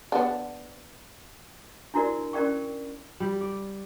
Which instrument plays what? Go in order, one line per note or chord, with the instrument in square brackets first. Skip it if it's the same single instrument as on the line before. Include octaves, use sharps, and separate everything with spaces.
[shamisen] B3 D4
[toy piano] D4 E4 F#4 A#4 D5
C#4 A#4 D5 G5 C#6
[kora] G3
D5